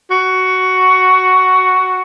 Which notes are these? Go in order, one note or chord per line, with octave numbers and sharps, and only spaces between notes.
F#4